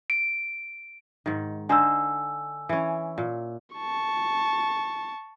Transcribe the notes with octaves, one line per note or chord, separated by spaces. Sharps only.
D7
G#2 D#3
D3 D#4 C5 G#5 E6
E3 C#4
A#2
A5 C#6